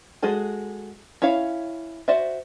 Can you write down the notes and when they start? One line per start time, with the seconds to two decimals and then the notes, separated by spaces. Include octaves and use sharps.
0.22 G#3 F#4 G#4 A4
1.22 C#4 E4 C#5 F5
2.08 F#4 C5 D5 E5